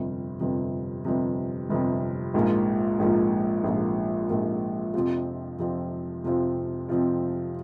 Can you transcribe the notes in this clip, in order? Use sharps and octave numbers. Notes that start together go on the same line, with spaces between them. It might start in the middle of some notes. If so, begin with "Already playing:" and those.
Already playing: G1 F2 C3
G1 F2 C3
G1 F2 C3
G1 F2 C3
A#1 G#2 F3 A#3 F4
A#1 G#2 F3 A#3 F4
A#1 G#2 F3 A#3 F4
A#1 G#2 F3 A#3 F4
F2 C3 F3 C4 F4
F2 C3 F3 C4 F4
F2 C3 F3 C4 F4
F2 C3 F3 C4 F4